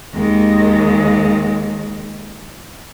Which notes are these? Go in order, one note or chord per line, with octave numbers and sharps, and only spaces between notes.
D#2 G#3